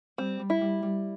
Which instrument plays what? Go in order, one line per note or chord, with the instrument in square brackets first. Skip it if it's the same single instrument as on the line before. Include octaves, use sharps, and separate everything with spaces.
[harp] G3 [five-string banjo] C4
[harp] G3
[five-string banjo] E4
[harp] G3
G3